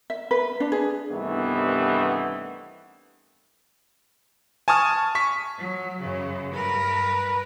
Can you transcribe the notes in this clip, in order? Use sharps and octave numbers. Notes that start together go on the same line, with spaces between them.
E5
B4
D4
G#4
C2 G2 D#3 E3 A3 B3
G#5 A5 C#6 D#6 F6
C#6 B6
F#3
F#2 C#3
G2 A#4 B4